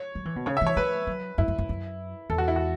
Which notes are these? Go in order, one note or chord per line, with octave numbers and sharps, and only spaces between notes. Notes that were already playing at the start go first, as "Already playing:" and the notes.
Already playing: C#5
F#3
E3
B2
C#3 C#5
E3 E5
C#5
A3 B4
F#3
F#2 E4
F#2
F#2
F#2
E2 A4
F#4
E4
F#4